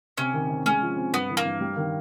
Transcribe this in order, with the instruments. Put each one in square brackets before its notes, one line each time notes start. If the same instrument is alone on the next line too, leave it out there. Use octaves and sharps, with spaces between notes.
[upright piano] C3 [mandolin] C#4
[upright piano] D#3
C3
[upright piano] G#3 [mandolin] C#4
[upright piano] F3
C4
[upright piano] G2 [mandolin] B3
[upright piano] E3
[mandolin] A#3
[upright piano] G2
G3
D#3